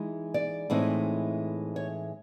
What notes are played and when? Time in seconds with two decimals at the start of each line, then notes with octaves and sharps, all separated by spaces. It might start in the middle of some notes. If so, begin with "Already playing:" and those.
Already playing: E3 G#3 D#4
0.34 D5
0.70 A2 E3 G#3 C4 D#4
1.76 C#5